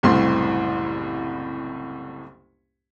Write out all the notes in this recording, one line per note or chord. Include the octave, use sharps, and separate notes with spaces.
F#1 C2 A2 G3 C6